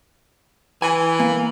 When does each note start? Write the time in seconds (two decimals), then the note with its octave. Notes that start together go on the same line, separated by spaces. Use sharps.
0.82 E3 G#5
1.20 A#3